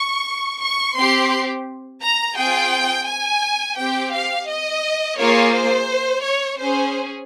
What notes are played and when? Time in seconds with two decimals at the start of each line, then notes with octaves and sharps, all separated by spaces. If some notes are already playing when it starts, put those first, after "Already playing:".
Already playing: C#6
0.61 C#6
0.96 C4 G4 C6
2.01 A#5
2.37 C4 F4 G#4 G5
3.07 G#5
3.77 C4 G4 G5
4.12 F5
4.48 D#5
5.18 A#3 F4 G#4 C#5
5.54 C5
6.23 C#5
6.59 C#4 G#4 C5